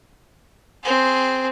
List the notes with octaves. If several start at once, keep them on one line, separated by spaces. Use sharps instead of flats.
C4 G#4